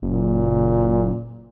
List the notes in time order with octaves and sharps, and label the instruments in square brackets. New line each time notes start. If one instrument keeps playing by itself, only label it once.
[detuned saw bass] F#1 [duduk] A#2